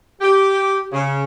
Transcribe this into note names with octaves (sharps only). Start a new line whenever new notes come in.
G4
C#3